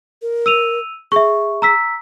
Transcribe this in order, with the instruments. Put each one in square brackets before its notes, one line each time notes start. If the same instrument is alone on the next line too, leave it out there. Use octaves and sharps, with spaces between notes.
[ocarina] A#4
[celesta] E6 D#7 F7
[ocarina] G#4 [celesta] E5 C#6
[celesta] A#5 E6 B6